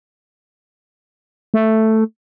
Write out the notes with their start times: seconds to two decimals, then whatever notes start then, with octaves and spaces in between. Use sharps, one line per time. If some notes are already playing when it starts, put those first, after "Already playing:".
1.54 A3